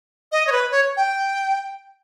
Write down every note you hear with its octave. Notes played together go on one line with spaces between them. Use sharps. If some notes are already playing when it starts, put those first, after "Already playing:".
D#5
C#5
B4
C#5
G5